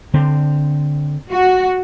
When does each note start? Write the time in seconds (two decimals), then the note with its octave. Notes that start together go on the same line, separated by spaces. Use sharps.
0.14 D3 C4
1.30 F#4